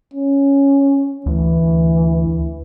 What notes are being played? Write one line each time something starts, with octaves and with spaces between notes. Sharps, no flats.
C#4
D2 E3